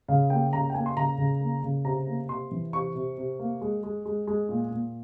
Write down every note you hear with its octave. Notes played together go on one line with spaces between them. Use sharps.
C#3 F5
A#3 G5
C#3 A#5
G5
A#3 G#5
C6
C#3 A#5
C#3
A#3
C#3
C3 A#5
A#3
C3 C6
E3
C3 C#6
C3
C3
A#3
G#3
G#3
G#3
G#3
A#2
A#2